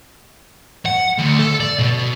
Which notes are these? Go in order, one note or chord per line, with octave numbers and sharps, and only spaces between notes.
F#5
D2
A4
D5
B2